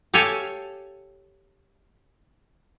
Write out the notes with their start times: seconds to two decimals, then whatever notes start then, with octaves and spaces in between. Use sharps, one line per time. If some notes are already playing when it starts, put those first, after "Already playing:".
0.14 G4 A4 C#5 F5 G#5